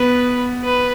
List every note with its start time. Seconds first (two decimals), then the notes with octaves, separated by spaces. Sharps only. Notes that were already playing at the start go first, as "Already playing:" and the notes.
Already playing: B3 B4
0.64 B4